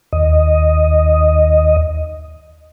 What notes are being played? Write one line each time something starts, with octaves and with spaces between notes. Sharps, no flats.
D#2 D#5